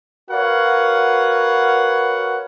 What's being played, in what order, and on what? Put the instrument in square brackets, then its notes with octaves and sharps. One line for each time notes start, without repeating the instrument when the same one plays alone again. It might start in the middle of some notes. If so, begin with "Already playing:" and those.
[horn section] F#4 A#4 B4 C#5 F5 F#5